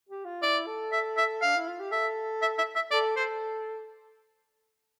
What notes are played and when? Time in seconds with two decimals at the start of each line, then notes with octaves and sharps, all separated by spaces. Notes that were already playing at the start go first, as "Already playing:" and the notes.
0.09 G4
0.25 F4
0.42 E4 D5
0.66 A4
0.92 E5
1.17 E5
1.42 D4 F5
1.56 E4
1.68 F4
1.80 G4
1.91 A4 E5
2.42 E5
2.58 E5
2.75 E5
2.91 A4 D5
3.16 A4 C5